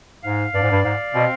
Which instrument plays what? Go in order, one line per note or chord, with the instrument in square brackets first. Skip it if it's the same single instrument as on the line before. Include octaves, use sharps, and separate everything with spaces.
[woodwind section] G#2 [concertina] F5
[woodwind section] G2 [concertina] D5
[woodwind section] G#2
G2
[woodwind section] G#2 [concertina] F5
[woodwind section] B2 [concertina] C4